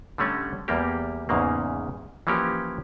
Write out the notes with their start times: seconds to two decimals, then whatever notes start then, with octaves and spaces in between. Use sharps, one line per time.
0.18 D3 G3 A3 C#4
0.68 E2 G3 A#3 G4
1.29 E2 G#2 C#3 A#3
2.27 E3 F3 A#3 C#4 G4